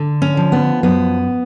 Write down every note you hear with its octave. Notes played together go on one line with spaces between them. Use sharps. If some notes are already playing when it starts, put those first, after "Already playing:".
Already playing: D3
C#4
F3
B3
F#2 B3